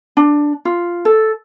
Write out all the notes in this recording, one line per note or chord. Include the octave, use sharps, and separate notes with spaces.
D4
F4
A4